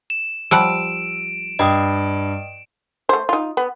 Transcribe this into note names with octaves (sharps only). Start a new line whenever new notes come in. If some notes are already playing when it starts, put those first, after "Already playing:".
E7
F3 G3 F#5 E6 D7
G2 D#5 G5 D#6
A3 C5
D#4 F4
B3